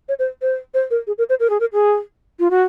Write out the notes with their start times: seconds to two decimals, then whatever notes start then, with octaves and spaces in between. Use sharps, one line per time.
0.09 C#5
0.19 C5
0.42 C5
0.74 C5
0.91 A#4
1.07 G#4
1.18 A#4
1.29 C5
1.40 A#4
1.50 G#4
1.60 A#4
1.73 G#4
2.39 F4
2.50 F#4